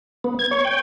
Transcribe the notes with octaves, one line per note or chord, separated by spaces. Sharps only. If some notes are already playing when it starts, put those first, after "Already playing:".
B3
G#6
C#5
G5